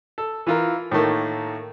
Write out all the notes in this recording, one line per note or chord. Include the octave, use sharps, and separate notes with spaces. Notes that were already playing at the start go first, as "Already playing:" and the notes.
A4
E3 F4 A#4
A2 D#3 A3 A#3